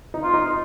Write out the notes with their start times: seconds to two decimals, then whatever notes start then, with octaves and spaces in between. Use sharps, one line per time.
0.14 D#4
0.23 F4
0.34 D#4